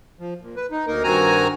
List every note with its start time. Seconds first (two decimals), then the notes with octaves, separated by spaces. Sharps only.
0.20 F3
0.41 A#2
0.56 B4
0.71 D#4
0.87 D2 A#3 D#4 A#4
1.04 G2 D#3 C4 F#4 G#5 A#5